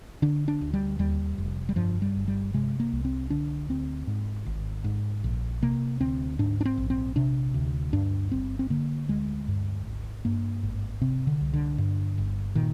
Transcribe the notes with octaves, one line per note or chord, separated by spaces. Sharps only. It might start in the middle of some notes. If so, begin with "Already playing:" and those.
D3 D4
D4
D2
G3
D#2 G3
F1
G3
G2 F3
G3
G1
G3
C3 G#3
A#3
C2
C4
D3 D4
D2 C4
G#2
G#1
G#2
A#1
C3 A#3
D2 C4
G#2 D4
D4
C4
A#1
C4
C3 D4
D2
G2 D4
G1 C4
C4
D3 A#3
D2 G#3
G2
G#1
G2 A#3
G#1
C3 C4
D3
C2
D3
G2
G1
A#2 D#3